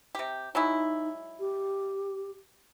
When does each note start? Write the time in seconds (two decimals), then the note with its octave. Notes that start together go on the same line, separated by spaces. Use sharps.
0.15 C3 G4
0.55 F#3 G#3 D#4 E4
1.40 G4